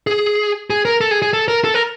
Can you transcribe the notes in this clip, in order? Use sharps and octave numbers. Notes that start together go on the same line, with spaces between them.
G#4
G#4
A#4
A4
G#4
G#4
A4
A#4
A4
A#4